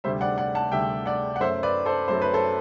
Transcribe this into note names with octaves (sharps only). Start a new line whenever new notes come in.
D2 C3 G3 C5 E5
D5 F#5
D5 F#5
F#5 A5
D2 C3 G3 E5 G5
D5 F#5
F#5
F#2 F#3 A3 C5 E5
B4 D5
A4 C5
F#2 F#3 A3 C5
B4
A4 C5